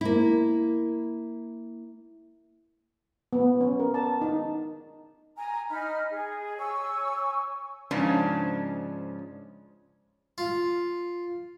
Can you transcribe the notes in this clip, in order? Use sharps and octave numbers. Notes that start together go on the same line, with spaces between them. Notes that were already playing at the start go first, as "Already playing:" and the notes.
A#3 E4
B3
C#4
A#4
A5
D#4
G#5 A#5
D#4 D#5 B5 F6
G#4
C#5 G#5 C#6 E6
G#2 C#3 F3 C#4 D4
F4